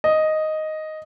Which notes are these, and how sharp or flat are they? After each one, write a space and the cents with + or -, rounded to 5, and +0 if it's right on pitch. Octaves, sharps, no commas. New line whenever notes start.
D#5 +0